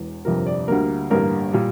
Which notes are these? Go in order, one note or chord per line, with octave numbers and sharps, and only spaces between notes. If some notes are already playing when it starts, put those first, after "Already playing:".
Already playing: E1 E2
G1 F2 C3 F3 A#4
D5
D2 D3 G3 A#3 A#4
A1 G2 D3 G3 A#3 A#4
A#2 G3